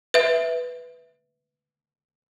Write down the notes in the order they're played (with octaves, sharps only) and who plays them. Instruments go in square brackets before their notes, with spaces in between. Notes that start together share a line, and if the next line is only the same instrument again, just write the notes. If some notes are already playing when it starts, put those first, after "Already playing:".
[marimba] B4 E5